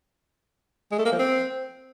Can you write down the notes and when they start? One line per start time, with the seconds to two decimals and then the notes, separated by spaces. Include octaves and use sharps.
0.92 G#3
0.98 A3
1.05 A#3
1.12 F3
1.19 C4